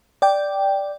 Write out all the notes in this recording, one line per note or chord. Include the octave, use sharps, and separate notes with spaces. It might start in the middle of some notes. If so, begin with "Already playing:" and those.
D5 G5